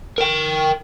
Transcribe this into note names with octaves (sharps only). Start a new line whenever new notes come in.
A#4 G5